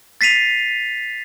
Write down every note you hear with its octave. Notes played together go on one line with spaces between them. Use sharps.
A6 B6 C7 D#7 F7